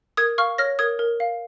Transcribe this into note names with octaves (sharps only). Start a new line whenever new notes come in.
A#4 D#6 G#6
F5 C#6 F6
C#5 F6 A#6
A#4 D#6 G#6
A#4
F5